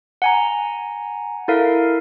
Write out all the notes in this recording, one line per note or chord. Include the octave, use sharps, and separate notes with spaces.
F#5 G#5 A#5
E4 A4 A#4 F5